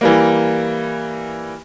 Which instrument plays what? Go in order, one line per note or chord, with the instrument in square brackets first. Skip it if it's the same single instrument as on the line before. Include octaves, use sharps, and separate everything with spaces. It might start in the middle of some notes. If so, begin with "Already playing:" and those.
[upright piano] E3 G3 A#3